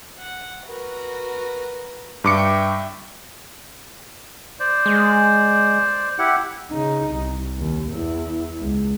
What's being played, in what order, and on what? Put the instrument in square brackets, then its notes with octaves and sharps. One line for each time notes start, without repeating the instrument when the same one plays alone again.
[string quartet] F#5
F#4 A#4 B4
[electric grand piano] G2 D6 C#7 [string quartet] E5 G5
[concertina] C5 D5
[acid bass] G#3
[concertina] E4 G4 F#5
[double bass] C#3 D#4
C2
D#2
E2 E4
C#2